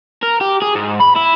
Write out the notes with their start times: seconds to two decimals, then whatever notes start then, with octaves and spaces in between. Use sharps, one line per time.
0.23 A#4
0.41 G4
0.62 G#4
0.75 G#2
1.00 B5
1.16 E4